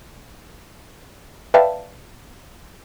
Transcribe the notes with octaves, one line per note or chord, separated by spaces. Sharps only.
B4 D5 E5 F5 G5 A5